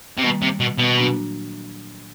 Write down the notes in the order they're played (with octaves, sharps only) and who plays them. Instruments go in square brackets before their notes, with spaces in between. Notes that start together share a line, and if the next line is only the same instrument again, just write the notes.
[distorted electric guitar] C3
[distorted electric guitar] B2 [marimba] D#3 G3 A#3
[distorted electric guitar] C3
B2
B2
[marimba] A#2 F#3 A#3 D4 F#4